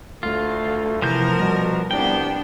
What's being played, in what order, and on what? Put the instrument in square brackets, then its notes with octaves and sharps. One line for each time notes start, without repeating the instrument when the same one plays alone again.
[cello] D2 [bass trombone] A3 [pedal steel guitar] F4
[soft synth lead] C3 [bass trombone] E3 [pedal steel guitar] F3 B3 G6 [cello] A#4
[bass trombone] B2 [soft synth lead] G3
[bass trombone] C2 [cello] B3 D4 [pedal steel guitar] G5